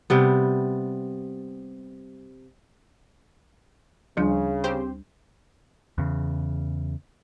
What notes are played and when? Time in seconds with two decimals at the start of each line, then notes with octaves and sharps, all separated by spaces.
0.10 C3 G3 B3
4.17 D2 C#3 F3 G3 D4
4.64 C4 G4 C5
5.98 E2 C#3